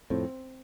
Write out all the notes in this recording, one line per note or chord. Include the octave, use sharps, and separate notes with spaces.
F2 A2 C4